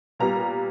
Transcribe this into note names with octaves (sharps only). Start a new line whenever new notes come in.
A#2 G3 B3 A#5